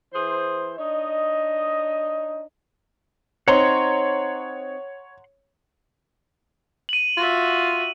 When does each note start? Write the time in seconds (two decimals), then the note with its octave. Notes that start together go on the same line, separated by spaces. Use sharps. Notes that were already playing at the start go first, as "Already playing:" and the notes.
0.14 E3 G#4 C5
0.78 D4 D#4 C#5 D#5
3.48 C4 D#4 C#5 F#5 A#5 C6
6.89 D#7 F#7
7.18 F4 F#4 E5